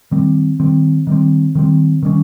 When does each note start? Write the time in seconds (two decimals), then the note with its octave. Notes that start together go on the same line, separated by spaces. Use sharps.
0.11 D#3 G3 C4
0.60 D#3 G3 C4
1.07 D#3 G3 C4
1.55 D#3 G3 C4
2.03 D#3 G3 C#4